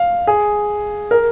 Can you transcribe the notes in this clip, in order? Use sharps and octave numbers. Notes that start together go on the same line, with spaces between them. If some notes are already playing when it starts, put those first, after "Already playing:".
Already playing: F5
G#4
A#4